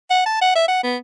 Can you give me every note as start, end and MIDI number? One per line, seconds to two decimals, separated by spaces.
0.10 0.23 78
0.26 0.39 81
0.41 0.53 78
0.56 0.66 76
0.68 0.80 78
0.84 0.97 59